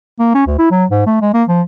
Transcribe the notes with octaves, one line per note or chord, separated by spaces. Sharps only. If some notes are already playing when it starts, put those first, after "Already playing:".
A#3
C#4
D2
E4
F#3
G#2
A3
G#3
A#3
F3